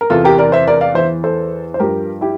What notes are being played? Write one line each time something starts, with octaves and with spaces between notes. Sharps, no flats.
A#4
E2 C3 E3 F4 A4
G4 A#4
A#4 D5
C5 E5
A#4 D5
D5 F5
E2 E3 C5 E5
A4 C5
C5
G2 F3 G4 A#4
E4 G4